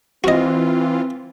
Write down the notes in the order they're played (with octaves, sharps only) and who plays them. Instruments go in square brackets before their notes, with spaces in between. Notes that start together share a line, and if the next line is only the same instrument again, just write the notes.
[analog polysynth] E3 F4 [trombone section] C4 [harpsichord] F#4 D#5